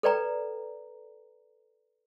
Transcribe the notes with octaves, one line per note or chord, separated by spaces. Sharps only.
A4 B4 D5 G5 A#5